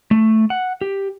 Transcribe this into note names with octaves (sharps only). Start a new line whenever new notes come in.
A3
F#5
G4